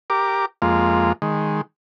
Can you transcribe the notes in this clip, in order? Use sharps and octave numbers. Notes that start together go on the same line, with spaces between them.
G4 A#4 D6
F2 G#3 A#3 F4
D#3 G#3